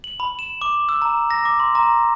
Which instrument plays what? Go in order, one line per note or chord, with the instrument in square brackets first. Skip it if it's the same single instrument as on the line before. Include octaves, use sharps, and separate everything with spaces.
[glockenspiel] F#7
B5
E7
D6
E6
A#5
A#6
D6
C6
A#5